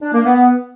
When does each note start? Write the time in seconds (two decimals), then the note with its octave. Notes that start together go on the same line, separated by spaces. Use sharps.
0.02 D4
0.13 A#3
0.25 B3